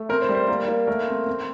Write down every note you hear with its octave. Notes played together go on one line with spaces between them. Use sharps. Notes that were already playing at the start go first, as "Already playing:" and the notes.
Already playing: A3
C4 A#4
C5
G3
C5
A#3
A#3
A3 A#4
C4
C4